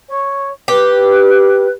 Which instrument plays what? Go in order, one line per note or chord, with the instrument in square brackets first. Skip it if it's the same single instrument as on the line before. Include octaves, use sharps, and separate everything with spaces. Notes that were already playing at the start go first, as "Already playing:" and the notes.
[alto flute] C#5
[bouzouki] G4 [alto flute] B4